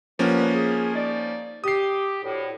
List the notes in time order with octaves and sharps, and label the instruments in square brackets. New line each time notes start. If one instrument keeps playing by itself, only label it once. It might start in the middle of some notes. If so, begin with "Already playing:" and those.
[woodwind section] G2 B3 B4 [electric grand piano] F3 A#3 C#4
[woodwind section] G#4
D#4 D5
[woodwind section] G4 [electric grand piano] D#6 C7
[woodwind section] D2 A2